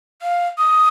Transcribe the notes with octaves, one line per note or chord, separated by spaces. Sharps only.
F5
D#6